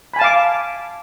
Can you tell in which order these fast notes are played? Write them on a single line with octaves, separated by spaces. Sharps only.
B5 G#5 A5 F5 D6